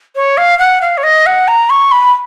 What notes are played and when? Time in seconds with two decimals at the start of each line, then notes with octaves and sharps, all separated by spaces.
0.16 C#5
0.37 F5
0.59 F#5
0.82 F5
0.98 C#5
1.03 D#5
1.26 F#5
1.48 A#5
1.70 C#6
1.92 B5